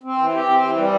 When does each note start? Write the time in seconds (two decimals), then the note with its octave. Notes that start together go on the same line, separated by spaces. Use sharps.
0.03 C4
0.18 E3
0.33 G4
0.48 C4
0.62 E3
0.77 G3